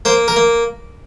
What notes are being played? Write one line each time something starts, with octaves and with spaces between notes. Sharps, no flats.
A#3 C5
A#4
A#3